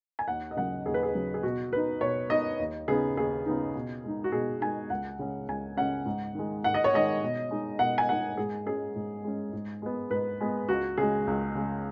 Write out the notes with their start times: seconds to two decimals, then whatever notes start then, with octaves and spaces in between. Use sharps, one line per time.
0.19 G#5
0.28 D#2 F#5
0.51 D#5
0.56 C#3 F#3 F#5
0.86 D#2 G#4
0.94 B4
1.03 G#4
1.15 C#3 F#3
1.34 G#4
1.43 B2 F#4
1.72 B3 D#4 B4
2.01 B2 C#5
2.30 B3 D#4 D#5
2.59 D#2
2.88 C#3 B3 D#4 G#4
3.17 D#2 G#4
3.46 C#3 B3 D#4
3.75 B2
4.04 G#3 D#4
4.24 F#4
4.32 B2 G#4
4.61 G#3 D#4 G#5
4.90 C#2 F#5
5.19 C#3 G#3 C#4
5.48 C#2 G#5
5.77 C#3 G#3 C#4 F#5
6.06 G#2
6.35 D#3 G#3
6.64 G#2 F#5
6.74 D#5
6.84 C#5
6.94 D#3 G#3 D#5
7.22 B2
7.51 G#3 D#4
7.79 B2 F#5
7.98 G#5
8.09 G#3 D#4 F#5
8.37 G#2 G#4
8.66 G#3 C#4 G#4
8.95 G#2
9.24 G#3 C#4
9.53 G#2
9.82 G#3 B3
10.10 G#2 B4
10.40 G#3 B3
10.69 C#2 F#4
10.97 C#3 G#3 G#4
11.27 C#2
11.55 C#3 G#3